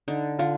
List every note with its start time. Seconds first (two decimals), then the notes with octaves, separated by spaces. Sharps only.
0.08 D3 D#4
0.39 D3 F4